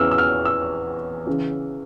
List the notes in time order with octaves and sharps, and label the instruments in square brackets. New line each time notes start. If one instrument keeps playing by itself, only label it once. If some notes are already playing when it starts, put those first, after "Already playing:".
Already playing: [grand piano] E2 C#3 E3 E6 F6
E6
F6
E6
C#3 E3